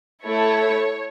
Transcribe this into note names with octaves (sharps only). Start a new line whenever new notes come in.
A3 E4 A4 C#5